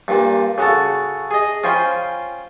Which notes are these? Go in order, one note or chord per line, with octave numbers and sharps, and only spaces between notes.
G2 A#2
C#3 F#4 A4
G#4 D#5
C#4 F4 C5 G5 G#5 B5